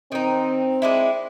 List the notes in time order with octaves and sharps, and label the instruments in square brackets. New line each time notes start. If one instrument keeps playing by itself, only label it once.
[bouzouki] D#3 D#4 [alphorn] C4
[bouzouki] G#3 D4 E4